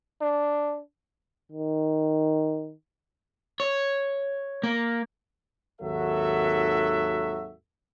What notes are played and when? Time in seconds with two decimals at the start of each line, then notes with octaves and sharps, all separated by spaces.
0.21 D4
1.52 D#3
3.60 C#5
4.63 A#3
5.81 G#1 D#2 F#3 F#4 A4 E5